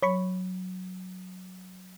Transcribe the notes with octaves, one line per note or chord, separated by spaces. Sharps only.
F#3 C#5 B5 C#6